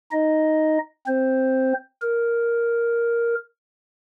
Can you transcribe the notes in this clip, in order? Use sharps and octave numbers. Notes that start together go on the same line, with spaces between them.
D#4 D#5
C4 C5
A#4